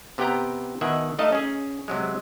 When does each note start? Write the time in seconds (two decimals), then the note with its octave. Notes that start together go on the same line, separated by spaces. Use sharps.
0.18 C3 B3 G4 B4 G5 A#5
0.81 B2 D#3 E5 F#5 G#5
1.19 A3 D#4 D#5 F5 A5
1.32 C#4 G#4
1.88 C3 F#3 G#3